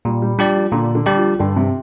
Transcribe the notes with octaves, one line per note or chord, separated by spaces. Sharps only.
A#2 G3
G3
F3 G3 D4 G4 D5
F3
A#2 D3
D3
G3 D4 G4 D5
F3
G2 D3
C3